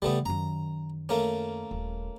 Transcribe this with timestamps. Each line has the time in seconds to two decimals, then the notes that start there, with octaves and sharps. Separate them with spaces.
0.02 C#3 G3 A3 B3 F4
0.26 F#2 D#3 A#5
1.09 A3 A#3 C#4
1.71 D#1